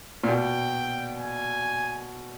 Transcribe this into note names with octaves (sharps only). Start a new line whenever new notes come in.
A#2
B2 G5
G#5